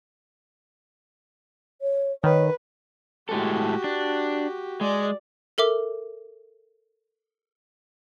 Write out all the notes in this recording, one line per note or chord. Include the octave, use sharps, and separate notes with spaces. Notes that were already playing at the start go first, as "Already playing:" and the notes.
C#5
D#3 B4 C#5
A2 G#3 F#4 G4 A4
D4
G#3 D5
A4 A#4 E5 D6